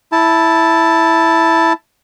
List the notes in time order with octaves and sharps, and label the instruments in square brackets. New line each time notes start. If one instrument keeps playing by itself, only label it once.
[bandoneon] E4 A5